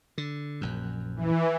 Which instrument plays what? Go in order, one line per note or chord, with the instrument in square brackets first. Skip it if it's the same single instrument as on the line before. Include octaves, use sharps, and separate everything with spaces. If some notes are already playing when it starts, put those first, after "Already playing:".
[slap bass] D3
A#1 F#2
[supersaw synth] E3